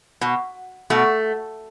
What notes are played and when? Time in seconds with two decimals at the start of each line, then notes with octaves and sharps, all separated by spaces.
0.21 B2
0.90 B2 A3